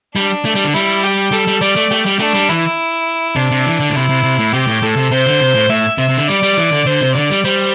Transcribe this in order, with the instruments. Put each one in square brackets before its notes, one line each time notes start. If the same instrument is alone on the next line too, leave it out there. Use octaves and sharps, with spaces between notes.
[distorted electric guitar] G3 [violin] D4
[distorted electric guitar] A3
G3
D3
[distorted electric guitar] G3 [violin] E4
[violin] G4
[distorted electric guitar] G3 [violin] A4
[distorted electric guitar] G3
[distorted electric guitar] G3 [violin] D5
[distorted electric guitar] A3
[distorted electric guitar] A3 [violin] G4
[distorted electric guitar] G3
[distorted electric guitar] A3 [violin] D4
[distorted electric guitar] G3
[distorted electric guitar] E3 [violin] E4
[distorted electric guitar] C3 [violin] D4
[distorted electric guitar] C3
E3
D3
A2
[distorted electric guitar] C3 [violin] E4
[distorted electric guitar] C3
C3
A2
[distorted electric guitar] C3 [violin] G4
[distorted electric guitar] A2
[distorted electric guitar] A2 [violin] A4
[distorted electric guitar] C3
[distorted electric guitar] C3 [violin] C5
[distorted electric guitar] D3
C3
A2
[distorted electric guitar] A2 [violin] E5
[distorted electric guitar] C3 [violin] E5
[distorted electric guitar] C3
D3
[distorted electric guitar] G3 [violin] D5
[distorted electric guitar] G3
E3
D3
[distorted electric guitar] D3 [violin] C5
[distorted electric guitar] C3
[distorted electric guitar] D3 [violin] D5
[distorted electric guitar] G3
[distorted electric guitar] G3 [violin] C5